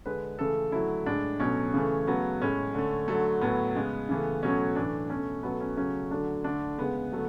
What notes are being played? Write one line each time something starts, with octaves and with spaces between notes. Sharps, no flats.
D3 G#3 B4
C#3 E3 A3 A4
D3 F#3 A3 E4
A2 G#3 D4
B2 F#3 A3 C#4
C#3 E3 A3
C#3 F#3 A3 B3
A2 G#3 C#4
D3 A3
D3 F#3 A3
A2 F#3 A3 B3
C#3 G#3
C#3 E3 A3
B2 F#3 A3 C#4
A2 E3 A3 D4
B2 A3 C#4
B2 F#3 A3 B3
C#4
C#3 F#3 A3 C#4
D3 F#3 A3 D4
D3 A3 D4
C#3 G#3 B3
D3 F#3 A3